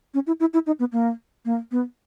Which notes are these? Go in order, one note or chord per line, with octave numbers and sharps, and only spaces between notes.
C#4
E4
E4
E4
D#4
B3
A#3
A#3
B3